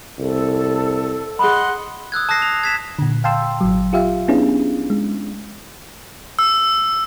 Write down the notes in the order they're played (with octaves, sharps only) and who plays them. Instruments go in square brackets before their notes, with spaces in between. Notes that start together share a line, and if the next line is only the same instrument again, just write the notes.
[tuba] C2 [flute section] A4
[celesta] G#4 B5 [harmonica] D#5 F#5 C6
[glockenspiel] D#6 E6 F#6 G#6
A5 D#6 F#6 A#6 C7
F7
G#6 B6 E7
[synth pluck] A#2 D3
F5 G5 A5 C6 E6
G#1 F#3
F4 G4 E5 F5
B3 C#4 D4 E4 G#4
G#3
[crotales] E6